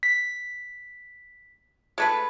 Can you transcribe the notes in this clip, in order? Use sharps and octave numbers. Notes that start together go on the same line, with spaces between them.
B6
G#3 A3 B4